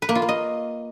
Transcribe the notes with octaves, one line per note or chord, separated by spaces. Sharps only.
B4
A#3
F4
A#3
D#5